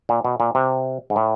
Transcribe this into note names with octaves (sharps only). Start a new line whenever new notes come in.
A#2
B2
A#2
C3
G#2
A2